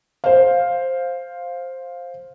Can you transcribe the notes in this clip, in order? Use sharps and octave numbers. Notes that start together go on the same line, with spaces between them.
C5 F5